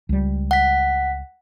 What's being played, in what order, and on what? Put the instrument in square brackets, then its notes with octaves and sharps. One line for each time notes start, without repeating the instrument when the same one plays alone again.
[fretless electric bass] C#2 G3
[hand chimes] F#5 B6